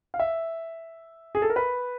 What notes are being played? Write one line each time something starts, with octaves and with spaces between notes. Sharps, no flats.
F5
E5
G#4
A4
A#4
B4